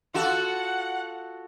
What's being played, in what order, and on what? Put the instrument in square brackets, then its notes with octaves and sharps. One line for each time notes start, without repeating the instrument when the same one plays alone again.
[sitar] F4 F#4 A4 [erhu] F#5